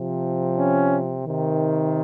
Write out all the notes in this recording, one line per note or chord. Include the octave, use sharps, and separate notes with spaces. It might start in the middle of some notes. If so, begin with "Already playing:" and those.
Already playing: C3 F3
C#4
C3 D#3